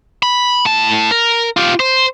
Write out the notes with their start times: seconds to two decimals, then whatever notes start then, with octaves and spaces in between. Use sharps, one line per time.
0.23 B5
0.65 A2 A5
1.11 A#4
1.57 F4 G4
1.80 C5